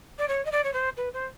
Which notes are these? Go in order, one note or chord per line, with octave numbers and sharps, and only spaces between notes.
D5
C#5
D#5
D5
C#5
C5
B4
C5